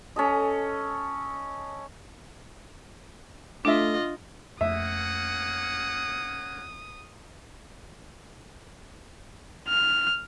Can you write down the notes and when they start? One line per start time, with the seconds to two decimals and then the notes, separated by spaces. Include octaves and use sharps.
0.16 C#4 A4 D#5
3.65 A3 D4 F4 D#5 E5 D6
4.61 F2 A3 A#3 C#4 E5 F#5 D#6
9.68 F6